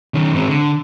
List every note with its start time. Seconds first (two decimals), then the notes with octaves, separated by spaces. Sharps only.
0.14 D#3 C#4
0.34 G#2 C4
0.48 D3